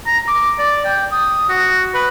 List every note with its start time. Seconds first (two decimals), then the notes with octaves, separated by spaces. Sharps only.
0.06 A#5
0.28 D6
0.58 D5
0.84 G5
1.11 D#6
1.48 F#4
1.94 B4